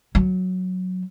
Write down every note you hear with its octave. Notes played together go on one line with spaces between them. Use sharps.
F#3